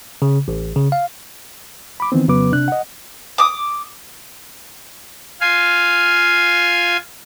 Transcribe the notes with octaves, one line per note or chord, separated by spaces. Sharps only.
C#3
A1
C#3
F5
B5 D6
D#3 E3 B3 C4
F2 C#3 F#3 B3 B4 D6
C3 D4 F#6
D#5 F#5
D6 D#6
F4 F5 G#5